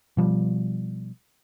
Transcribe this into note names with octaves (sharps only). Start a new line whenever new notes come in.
B2 F3 G3